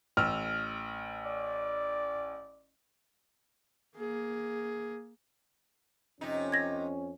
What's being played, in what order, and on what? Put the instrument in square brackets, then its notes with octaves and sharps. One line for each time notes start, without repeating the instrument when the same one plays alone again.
[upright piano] A1 E6 [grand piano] F6
[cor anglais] D5
[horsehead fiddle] A#3 G#4
[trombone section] F2 C#4 [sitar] C3 D#4
[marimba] G#6 A#6